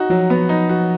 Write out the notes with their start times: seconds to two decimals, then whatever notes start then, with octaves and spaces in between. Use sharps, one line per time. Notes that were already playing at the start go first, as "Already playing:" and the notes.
Already playing: D#4 F#4
0.10 F3 F#3
0.30 B3
0.49 D#4
0.69 F#4